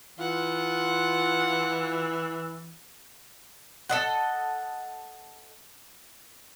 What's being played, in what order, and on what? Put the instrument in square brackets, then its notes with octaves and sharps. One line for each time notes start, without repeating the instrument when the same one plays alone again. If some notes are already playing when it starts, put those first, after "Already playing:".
[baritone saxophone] E3 [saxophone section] F4 [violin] F#5
[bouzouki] A4 D#5 F#5